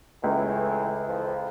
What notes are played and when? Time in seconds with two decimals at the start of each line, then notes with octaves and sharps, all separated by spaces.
0.24 C#2 A2 E3
1.08 F2 E3 F3